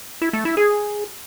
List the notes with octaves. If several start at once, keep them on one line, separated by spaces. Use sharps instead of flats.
E4
A3
E4
G#4